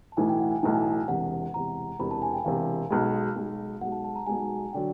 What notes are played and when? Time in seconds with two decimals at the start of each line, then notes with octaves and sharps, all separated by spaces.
0.12 A5
0.17 B1 A2 E3 G#5
0.29 G5
0.39 F#5
0.51 G#5
0.63 B1 A2 E3 A5
0.74 G#5
1.08 E1 E2 C3 F#5
1.54 E1 E2 C3 A#5
1.99 E1 E2 C3 B5
2.11 A5
2.22 G#5
2.33 G5
2.45 E1 E2 C3 F5
2.90 B1 B2 G#3
3.36 B1 B2 G#3
3.81 B1 B2 G#3 F#5
3.92 A5
4.04 A5
4.16 A#5
4.27 B1 B2 G#3 G#5
4.73 D3 F#3 G5